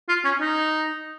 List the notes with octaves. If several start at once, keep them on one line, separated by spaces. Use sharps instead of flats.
F4
C#4
D#4